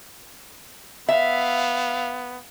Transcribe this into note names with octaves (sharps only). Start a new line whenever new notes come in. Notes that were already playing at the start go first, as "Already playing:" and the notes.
B3 E5 F5